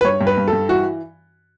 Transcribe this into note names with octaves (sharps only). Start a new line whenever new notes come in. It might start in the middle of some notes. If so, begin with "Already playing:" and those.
B4
G2 C#5
G2
B4
G2
G2 A4
E3 F#4